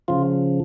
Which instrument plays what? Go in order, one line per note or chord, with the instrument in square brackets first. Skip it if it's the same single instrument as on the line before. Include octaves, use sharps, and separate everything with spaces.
[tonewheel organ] C#3 F3 F4